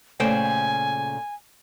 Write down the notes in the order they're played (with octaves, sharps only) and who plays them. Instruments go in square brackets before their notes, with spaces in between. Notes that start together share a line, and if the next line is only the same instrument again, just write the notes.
[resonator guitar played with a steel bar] A#2 C5 G5 [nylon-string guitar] C#3 A3 [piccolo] G#5